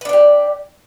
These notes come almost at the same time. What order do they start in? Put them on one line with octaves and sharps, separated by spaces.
B4 D4 D5 G4